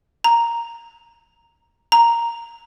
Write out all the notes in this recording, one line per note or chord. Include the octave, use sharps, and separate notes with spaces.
A#5
A#5